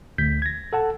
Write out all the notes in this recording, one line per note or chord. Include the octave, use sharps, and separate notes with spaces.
D2 G6 B6
G#6 A#6
A4 F#5 A5